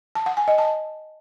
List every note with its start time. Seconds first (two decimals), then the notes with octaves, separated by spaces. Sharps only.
0.15 A5
0.26 F#5
0.37 G#5
0.48 D#5
0.58 A5